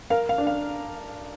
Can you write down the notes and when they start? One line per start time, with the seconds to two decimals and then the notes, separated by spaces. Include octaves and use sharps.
0.10 A#4 F5
0.29 F5
0.38 D4
0.47 F5